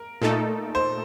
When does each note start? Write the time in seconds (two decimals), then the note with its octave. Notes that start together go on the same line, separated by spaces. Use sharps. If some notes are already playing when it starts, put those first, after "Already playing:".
Already playing: A#4
0.22 A#2 A3 D#4 A4
0.75 C5